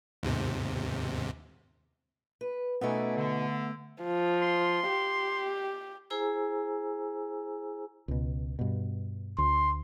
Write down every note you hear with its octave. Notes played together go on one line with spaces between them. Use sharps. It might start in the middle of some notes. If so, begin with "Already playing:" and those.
D#2 G#2 C3
B4
B2 A3 B3 C#4 D#4 D5 E5 G#5
D3
F3
C6
G4
E4 G#4 C5 G#5 A#5 E6
C#2 B2
G2 B2
D2 C6